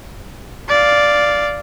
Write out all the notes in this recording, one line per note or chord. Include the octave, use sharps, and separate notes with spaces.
D5 F5